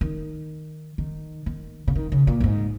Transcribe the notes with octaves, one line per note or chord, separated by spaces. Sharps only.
D#3
D#3
D#3
C#3
D#3
C#3
A#2
F#2
G#2